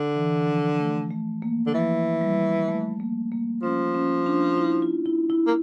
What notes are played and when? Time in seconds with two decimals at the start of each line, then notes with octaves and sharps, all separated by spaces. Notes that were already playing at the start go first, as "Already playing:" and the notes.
Already playing: D3
0.16 E3
0.47 F3
0.79 A3
1.10 A3
1.42 A#3
1.67 D3
1.74 E3 F3
2.21 G3
2.68 A3
3.00 A#3
3.32 A#3
3.63 F3 C#4
3.95 C#4
4.26 D4
4.58 E4
4.82 F4
5.06 E4
5.30 E4
5.47 A#3